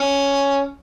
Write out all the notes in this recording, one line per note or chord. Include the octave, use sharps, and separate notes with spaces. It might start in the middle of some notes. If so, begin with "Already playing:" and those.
Already playing: C#4